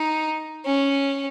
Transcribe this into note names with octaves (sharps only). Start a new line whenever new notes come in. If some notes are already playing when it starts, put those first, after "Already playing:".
Already playing: D#4
C#4